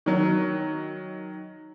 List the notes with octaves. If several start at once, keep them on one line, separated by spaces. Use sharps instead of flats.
D#3 F#3